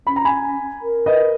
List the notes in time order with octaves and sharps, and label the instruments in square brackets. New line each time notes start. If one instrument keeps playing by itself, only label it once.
[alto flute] C#4 [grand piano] B5
[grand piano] A#5
G#5 B5
[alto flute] A#4
[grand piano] B4 D#5